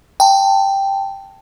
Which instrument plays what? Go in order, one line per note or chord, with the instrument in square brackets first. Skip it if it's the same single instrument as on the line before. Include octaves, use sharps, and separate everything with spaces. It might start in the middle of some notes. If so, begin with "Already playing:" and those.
[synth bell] G5 A5